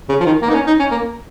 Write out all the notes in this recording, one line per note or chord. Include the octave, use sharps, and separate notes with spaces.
C#3
F3
D#3
A#3
D#4
C#4
D#4
C#4
A#3